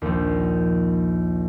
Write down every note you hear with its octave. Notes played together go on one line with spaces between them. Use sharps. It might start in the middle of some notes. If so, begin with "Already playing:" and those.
A#1 D#2